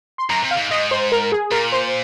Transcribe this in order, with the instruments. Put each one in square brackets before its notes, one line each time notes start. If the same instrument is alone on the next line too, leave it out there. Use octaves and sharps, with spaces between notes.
[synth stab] C6
[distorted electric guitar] F#2 [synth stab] A#5
[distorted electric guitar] C3
[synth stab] F5
[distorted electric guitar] G#2
[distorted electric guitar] G#2 [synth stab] D#5
[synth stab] C5
A#4
G#4
[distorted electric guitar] A#2 [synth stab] A#4
[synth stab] C5